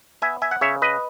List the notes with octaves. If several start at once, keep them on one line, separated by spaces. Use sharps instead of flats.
B3 E5 G#5
E5 G#5
F#5
C#3 C#5 E5
B4 D#5